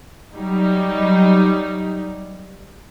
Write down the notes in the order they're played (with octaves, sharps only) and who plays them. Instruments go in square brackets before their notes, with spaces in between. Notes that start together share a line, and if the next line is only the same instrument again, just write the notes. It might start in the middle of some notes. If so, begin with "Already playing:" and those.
[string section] F#3 G3 D#4